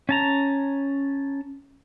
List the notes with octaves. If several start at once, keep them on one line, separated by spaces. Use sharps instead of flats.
C#4 A5 A#5